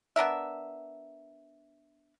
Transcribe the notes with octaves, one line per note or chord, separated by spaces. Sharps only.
B3 D4 A#4 E5